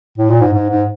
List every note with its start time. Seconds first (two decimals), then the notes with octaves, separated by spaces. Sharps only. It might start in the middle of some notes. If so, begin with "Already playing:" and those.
0.18 A2
0.29 A#2
0.41 G#2
0.52 G#2
0.70 G#2